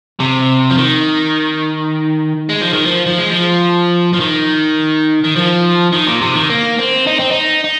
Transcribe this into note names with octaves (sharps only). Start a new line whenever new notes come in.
C3
F3
D#3
G#3
F3
D#3
F3
F3
G#3
F3
F3
D#3
D#3
F3
D#3
A#2
C3
D#3
A#3
C4
D#4
C4
D#4
D#4